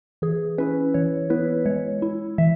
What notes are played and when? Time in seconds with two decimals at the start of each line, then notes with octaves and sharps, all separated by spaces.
0.22 E3 G#4
0.58 C#4 E4 B4
0.94 E3 C#5
1.30 B3 E4 B4
1.66 G#3 C#5
2.02 E4
2.38 E3 E5